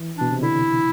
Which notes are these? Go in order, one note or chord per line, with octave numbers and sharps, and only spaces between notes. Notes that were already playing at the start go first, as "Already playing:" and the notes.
Already playing: E3
B2 D4
C3
D3 E4